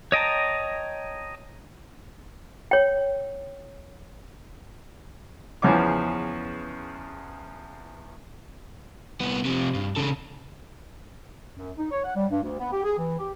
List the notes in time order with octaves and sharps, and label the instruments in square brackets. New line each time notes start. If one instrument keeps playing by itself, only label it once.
[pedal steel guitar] C#5 D#5 G5 A5 A#5
[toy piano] C#5 G5
[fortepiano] E2 C#3 F3 B3 C#4 D6
[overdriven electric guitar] C2 B3
C3 F3
G2
C#3 A4
[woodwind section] F#2
D#4
C#5
F#5
G3
G2
D2
B3
G4
G#4
E3
G4